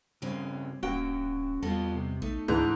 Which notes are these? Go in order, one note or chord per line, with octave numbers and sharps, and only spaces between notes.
G2 C#3 G3 C4 C#4
D1 G2 A#3 C#4 F#4 A#4 G5
E2 G3 B3 F4 A4 D#5
C3
A#1 A3 D#4
C#2 G#2 D3 E3 A#5